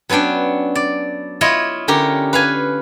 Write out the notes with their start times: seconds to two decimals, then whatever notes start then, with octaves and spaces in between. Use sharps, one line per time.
0.09 F#3 B3 C#4 D4 G5
0.75 D5
1.41 E4 F4 C#5 D#5
1.88 D3 C#4 G4 A#4
2.33 B4 F5 G#5